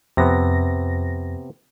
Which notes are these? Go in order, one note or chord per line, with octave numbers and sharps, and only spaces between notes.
F2 C3 B3 A#6